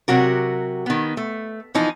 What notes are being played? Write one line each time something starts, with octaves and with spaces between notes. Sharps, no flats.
C3 F#3 F#4 A#4
D#3 B3
A3
E3 F3 D#4